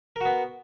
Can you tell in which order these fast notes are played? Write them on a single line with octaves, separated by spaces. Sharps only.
A#4 F#4 B3